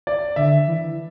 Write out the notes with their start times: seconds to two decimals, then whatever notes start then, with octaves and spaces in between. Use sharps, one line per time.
0.07 D5
0.36 D3 E5
0.68 E3